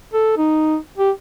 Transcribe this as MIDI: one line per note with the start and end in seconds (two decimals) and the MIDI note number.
0.13 0.34 69
0.38 0.77 63
0.98 1.11 67